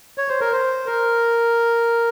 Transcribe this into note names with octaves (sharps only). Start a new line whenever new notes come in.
C#5
C5
A#4
C5
A#4